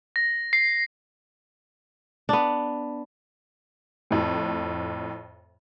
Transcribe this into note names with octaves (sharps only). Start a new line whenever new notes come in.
A#6
C7
B3 D4
F2 A2